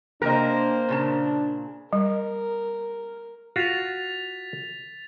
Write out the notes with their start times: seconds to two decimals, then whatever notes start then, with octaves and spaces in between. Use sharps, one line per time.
0.22 C3 A#3 C4 D4 A#4 C5 D#5
0.89 A#2 C#3 D4 A5
1.93 G3 A#4
3.56 F4 F#4 F5 A6 B6 F7